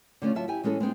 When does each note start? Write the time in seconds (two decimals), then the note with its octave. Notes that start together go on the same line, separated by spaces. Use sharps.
0.22 D3 A3 C#4 F4
0.35 F#3 F4 E5 A5
0.48 E4 G4 G#5
0.63 E3 G#3 C#4 G#4 A4
0.80 G#3 A3 C4 D#4